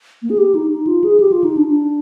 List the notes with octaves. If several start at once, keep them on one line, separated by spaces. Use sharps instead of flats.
A#3
G#4
G4
D#4
D#4
F4
G#4
G4
F4
D#4
D4
D4